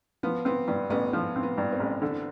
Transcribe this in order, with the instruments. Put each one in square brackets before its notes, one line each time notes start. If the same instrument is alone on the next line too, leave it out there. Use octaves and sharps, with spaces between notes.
[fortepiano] F3 [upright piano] B3
[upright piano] B3 [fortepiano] C4
[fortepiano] G2 [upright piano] B3
[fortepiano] A1 [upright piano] B3
[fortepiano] F3 [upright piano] B3
[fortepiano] C4
[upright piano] B3
[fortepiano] G2
[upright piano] C4
[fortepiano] A1
D3